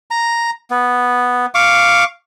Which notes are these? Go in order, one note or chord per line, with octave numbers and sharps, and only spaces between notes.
A#5
B3
F5 C#6 D6